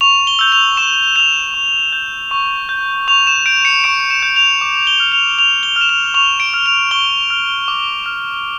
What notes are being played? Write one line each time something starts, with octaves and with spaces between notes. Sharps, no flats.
C#6 F7
G7
E6 G6
F7
C#6 E7
E6 G6 F7
C#6
G6
C#6
G6
C#6 F7
E7
G6 D7
C#7
C#6 D7
E7
G6
F7
D6
G7
F6
F7
D6 F7
G7
F6
E7
F7
C#6 F7
D7
F6
F7
C#6 G7
F6
D6
F6